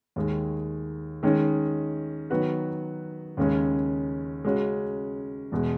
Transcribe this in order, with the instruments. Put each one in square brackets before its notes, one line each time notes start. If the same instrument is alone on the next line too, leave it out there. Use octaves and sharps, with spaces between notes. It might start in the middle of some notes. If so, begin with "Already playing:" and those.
[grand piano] D#2 D#3 G#3
D#3 G#3 C#4
D#3 F#3 B3 F#4 B4
D#2 C#3 G#3 C#4
C#3 G#3 C#4 F#4
E2 B2 G#3